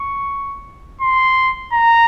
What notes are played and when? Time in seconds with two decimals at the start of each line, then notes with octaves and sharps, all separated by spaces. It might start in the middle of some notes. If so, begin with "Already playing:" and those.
Already playing: C#6
1.01 C6
1.73 A#5